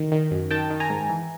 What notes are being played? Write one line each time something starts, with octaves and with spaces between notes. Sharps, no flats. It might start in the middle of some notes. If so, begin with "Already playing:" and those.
Already playing: D#3
D#3
F#2
D#3 G5 A5
D#3
G#5 A#5
G#2
E3